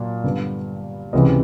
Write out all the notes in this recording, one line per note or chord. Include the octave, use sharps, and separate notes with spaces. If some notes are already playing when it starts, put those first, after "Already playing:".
Already playing: A#2 F#3 D4
G2 D3 G3 B3
C#2 C3 E3 G#3 D#5